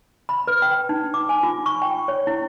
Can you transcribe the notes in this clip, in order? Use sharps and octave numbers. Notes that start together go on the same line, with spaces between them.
B5
B4
G5
D#4
D6
G#5
F4
C#6
G5
C#5
E4